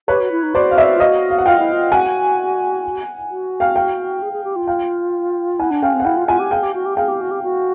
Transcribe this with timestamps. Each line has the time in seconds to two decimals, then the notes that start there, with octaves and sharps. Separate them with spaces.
0.08 G4 B4 C#5
0.20 F#4
0.31 E4
0.43 D#4
0.54 F#4 C5 D5
0.71 F5
0.77 D5 E5
0.95 F4
1.00 F#4 D#5 F5
1.30 F5
1.39 F#5
1.46 F4 F5 G5
1.59 E4
1.72 F4
1.92 F#4 F#5 G#5
3.30 F#4
3.60 F5 G5
3.76 F5 G5
4.22 G#4
4.33 G#4
4.44 G4
4.56 F4
4.67 F5 G5
5.59 E4 F#5 G#5
5.70 D4
5.82 C#4 F5 G5
5.94 C4
6.00 F#5
6.05 E4 F5 G5
6.17 F4
6.28 F4 F#5 G#5
6.39 G4
6.51 G#4 F5 G5
6.63 G4
6.74 F#4
6.86 G4
6.97 G#4 F5 G5
7.08 G4
7.21 F#4
7.31 G4
7.43 F#4